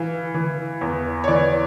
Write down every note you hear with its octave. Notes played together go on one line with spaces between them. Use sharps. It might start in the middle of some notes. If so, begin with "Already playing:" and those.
Already playing: E3 F5
E3
E2
C#5
E3 D5